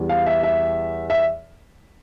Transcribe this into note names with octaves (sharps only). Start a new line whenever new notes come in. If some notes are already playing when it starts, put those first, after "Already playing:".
Already playing: E2 E3 G3
F5
E5
E5
E5